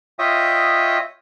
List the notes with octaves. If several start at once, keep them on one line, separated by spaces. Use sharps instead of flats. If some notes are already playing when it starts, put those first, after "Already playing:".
F4 C#5 D#5 E5 G5 D#6